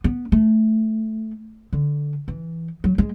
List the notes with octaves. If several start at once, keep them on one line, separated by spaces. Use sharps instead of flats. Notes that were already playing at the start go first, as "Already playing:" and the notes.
B3
A3
D3
E3
F#3
G#3